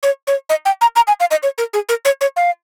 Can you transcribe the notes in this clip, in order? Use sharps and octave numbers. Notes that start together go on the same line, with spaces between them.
C#5
C#5
D#5
G5
A#5
A#5
G#5
F5
D#5
C#5
A#4
G#4
A#4
C#5
C#5
F5